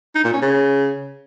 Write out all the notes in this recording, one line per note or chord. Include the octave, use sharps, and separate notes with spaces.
D#4
A#2
C#4
C#3